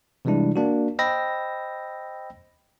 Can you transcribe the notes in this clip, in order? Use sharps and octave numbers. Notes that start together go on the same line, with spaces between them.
C3 E3 G3 G#3 D4 E4
A#3 D4 F#4
C5 D#5 G5 B5 E6 A#6